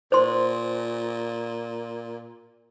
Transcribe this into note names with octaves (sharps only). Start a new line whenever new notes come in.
A#2 C5 C6